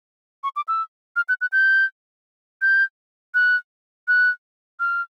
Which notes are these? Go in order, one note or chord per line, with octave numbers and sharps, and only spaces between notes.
C#6
D6
E6
F6
F#6
F#6
G6
G6
F#6
F#6
F6